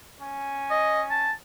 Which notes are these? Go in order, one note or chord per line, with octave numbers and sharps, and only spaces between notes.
C#4 G#5
D#5
A5